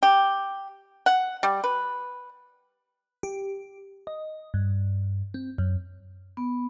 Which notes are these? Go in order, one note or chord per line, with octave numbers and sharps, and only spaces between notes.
G4
F#5
G3
B4
G4
D#5
G2
C4
F#2
B3